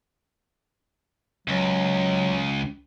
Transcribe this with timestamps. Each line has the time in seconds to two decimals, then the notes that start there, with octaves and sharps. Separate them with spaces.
1.48 C#2 F#3